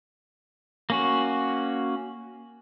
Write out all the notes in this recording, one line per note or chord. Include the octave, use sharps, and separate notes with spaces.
A#3 C#4 F#4